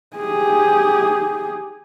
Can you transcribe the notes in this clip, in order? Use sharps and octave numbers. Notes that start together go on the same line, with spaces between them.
G4 G#4